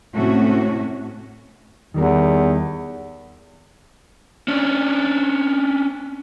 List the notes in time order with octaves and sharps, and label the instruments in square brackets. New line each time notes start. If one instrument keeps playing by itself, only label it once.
[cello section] A2 C3 A3 C#4 F#4
[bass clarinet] E2 [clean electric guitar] D#3 G3 A#4
[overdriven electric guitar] C#4 D4